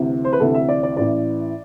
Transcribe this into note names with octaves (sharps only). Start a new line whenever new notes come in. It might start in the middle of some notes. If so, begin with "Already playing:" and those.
Already playing: D2 C3 E3
C5
B4
D2 C3 E3 A4
E5
D5
D5
A1 A2 E3 D5